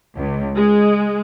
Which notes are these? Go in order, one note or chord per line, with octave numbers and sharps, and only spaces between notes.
C#2
G#3